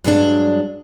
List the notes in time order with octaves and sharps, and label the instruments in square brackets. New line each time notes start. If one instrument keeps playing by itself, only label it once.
[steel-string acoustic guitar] G2 F#3 G#3 C#4 D4